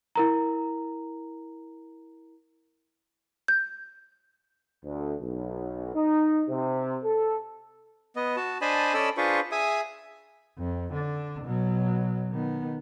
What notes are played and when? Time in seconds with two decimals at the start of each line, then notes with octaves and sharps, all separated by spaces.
0.15 E4 A#4 A#5
3.48 G6
4.84 D2
5.21 B1
5.95 D#4
6.48 C3
7.04 A4
8.16 B3 D#5
8.37 F#4 A5
8.61 D4 C5 D#5 G#5 A5 B5
8.94 C#4 A4 D5 D#5 B5 E6
9.17 D4 F4 G#4 B4 C5 C#6
9.52 G#4 E5 G#5 D#6
10.58 F2
10.93 D3 D4
11.44 B2 F#3
12.30 D#3 B3